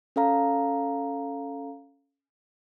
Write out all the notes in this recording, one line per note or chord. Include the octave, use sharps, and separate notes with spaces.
C#4 A4 F5 A#5